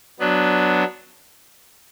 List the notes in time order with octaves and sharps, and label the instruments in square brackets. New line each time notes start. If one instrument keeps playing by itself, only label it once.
[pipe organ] F#3 B3 D4